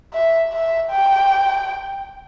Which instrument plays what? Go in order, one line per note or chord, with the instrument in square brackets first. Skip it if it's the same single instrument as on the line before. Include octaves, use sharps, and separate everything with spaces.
[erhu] E5
E5
G5